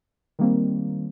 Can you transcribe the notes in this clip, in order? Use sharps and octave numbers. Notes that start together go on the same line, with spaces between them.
D#3 G3 A#3 C4